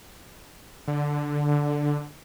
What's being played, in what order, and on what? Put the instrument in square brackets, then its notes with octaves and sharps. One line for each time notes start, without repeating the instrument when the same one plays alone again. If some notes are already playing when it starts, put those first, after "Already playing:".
[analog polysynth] D3